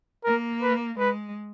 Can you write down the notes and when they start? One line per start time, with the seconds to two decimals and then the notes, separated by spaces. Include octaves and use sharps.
0.24 A#3 A#4
0.62 B4
0.99 G#3 B4